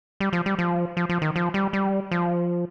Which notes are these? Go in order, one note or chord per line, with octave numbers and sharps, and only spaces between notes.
G3
F3
G3
F3
F3
F3
D#3
F3
G3
G3
F3